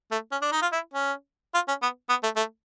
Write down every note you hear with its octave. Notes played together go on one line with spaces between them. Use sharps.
A3
C#4
D4
D#4
F4
E4
C#4
F4
C#4
B3
B3
A3
A3